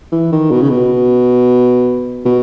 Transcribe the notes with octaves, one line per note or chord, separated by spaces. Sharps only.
E3
D#3
B2
C#3
B2
B2